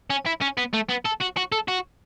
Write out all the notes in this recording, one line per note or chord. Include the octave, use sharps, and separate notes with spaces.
C#4
E4
C#4
B3
A3
B3
A4
F#4
F#4
A4
F#4